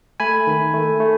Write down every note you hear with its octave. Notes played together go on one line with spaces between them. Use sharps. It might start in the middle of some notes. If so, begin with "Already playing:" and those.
A3 G#5 B5
D#3
A3
A3